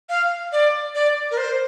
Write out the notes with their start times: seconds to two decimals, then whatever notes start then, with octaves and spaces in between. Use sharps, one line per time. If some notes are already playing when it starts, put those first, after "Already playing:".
0.09 F5
0.52 D5
0.95 D5
1.31 A#4
1.38 C5